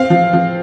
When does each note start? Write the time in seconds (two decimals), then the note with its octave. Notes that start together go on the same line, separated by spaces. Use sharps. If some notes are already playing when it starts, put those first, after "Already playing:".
Already playing: C4 F5
0.10 F3
0.33 F3